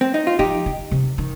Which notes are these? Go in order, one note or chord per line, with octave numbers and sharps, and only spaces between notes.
C4
D#4
F4
F3 D#4 G4
D#3
C3
D#3